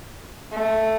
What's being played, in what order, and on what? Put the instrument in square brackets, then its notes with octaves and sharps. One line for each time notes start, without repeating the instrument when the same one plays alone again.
[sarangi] A3